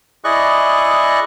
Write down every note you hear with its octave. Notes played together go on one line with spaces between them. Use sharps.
E4 G#4 D5 D#5 C#6 F#6